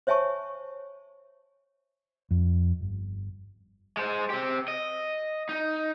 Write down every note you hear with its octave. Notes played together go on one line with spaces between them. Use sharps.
C5 C#5 E5 G#5 A5 C#6
F2
G1
G#3 C5
C4 G4
D#5
D#4